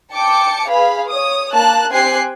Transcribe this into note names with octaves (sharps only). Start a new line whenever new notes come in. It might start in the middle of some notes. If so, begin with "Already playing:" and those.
G5 A5 D6 C#7
G#4 B4 F5 B5
C#5 D#6
A#3 A5 F#6
C4 G4 G5 G#5 F#6 C7